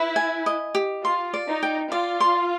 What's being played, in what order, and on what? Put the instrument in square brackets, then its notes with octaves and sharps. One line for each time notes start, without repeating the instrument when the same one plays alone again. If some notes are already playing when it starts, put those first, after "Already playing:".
Already playing: [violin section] E4 [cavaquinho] B4
[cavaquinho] G#5
D#5
G4
[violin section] F4 [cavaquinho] C6
[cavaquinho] D5
[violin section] D#4
[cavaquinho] G5
[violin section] F4 [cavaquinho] D5
[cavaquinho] C6